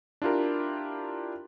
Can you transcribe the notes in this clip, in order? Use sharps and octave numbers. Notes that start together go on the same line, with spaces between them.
D4 E4 F4 G4 A#4